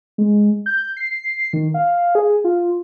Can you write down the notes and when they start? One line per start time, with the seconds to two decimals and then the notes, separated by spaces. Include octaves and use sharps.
0.18 G#3
0.66 G6
0.97 C7
1.53 D#3
1.74 F5
2.15 G#4
2.44 F4